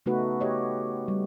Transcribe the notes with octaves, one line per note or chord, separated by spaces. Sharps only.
C#3 A3 B3 D#4 F#4 B4
G4 B4 C#5 D#5
G3